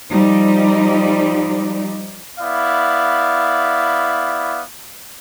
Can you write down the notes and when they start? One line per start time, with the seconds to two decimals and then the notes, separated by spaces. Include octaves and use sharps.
0.10 F3 G3 D#4 D5
2.40 B3 E4 D5 F5